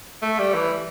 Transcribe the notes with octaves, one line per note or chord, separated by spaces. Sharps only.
A3
G3
E3